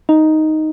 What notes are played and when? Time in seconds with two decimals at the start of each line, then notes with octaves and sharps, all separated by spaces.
0.09 D#4